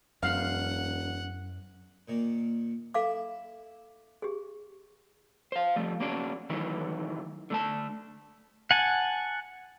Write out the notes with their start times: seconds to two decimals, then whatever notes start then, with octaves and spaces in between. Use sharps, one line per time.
0.23 E1 F#2 F5 F#5
2.08 A#2 D#3 A#3
2.94 E4 A4 E5 F5 D6
4.22 G4 G#4
5.52 C5 F5
5.76 F3 G3 A3
6.00 A#3 C#4 D4 F#4
6.50 D#3 E3 F#3 A3 E4
7.50 D3 A3 A5
8.71 F#5 G#5 A5